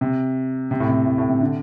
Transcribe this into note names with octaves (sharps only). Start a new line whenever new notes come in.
C3
C3
A2
C3
A2
A2
C3
D3